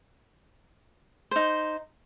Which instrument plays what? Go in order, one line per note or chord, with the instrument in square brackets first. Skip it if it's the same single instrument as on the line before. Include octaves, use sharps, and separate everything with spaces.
[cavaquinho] D#4 C5